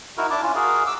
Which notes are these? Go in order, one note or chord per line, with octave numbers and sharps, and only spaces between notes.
D#4 E4 F#4 A#4
D4 E4 A5 D6
C#4 F4
F#4 G#4 A#4
D6 E6